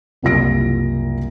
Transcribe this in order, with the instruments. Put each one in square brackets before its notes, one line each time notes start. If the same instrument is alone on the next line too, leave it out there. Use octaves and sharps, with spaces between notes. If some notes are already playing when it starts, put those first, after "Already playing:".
[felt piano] F#1 C2 F4 A#6 D7